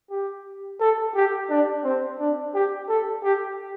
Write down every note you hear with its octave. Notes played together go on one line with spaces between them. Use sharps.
G4
A4
G4
D4
C4
D4
G4
A4
G4